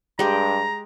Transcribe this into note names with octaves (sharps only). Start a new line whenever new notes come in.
G2 G#3 G4 A#5